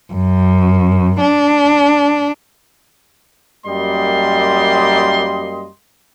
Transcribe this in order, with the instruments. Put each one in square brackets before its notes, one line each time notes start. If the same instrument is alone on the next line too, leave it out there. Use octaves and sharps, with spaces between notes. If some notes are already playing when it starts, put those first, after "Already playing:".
[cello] F#2
D4
[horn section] F#2 G3 A#3 D#5 C6